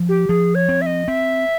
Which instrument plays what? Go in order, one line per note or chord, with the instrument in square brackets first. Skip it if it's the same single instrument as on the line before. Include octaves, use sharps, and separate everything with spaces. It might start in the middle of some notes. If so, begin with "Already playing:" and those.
Already playing: [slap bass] F3
[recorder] G4
[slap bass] F3 [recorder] G#4
[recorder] C#5
[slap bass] C4
[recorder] E5
D#5
[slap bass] C4 [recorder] E5